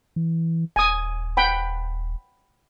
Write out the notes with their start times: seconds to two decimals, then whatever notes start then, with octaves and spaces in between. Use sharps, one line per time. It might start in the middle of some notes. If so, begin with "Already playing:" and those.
0.16 E3
0.76 D#1 G#5 D#6
1.37 F#5 G5 B5